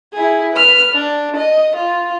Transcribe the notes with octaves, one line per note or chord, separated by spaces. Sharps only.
E4 G#4
B4 F6
D4
D#5
F4